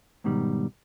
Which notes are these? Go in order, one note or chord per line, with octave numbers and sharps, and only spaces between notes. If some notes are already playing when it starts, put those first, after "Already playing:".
G#2 B2 D#3 G3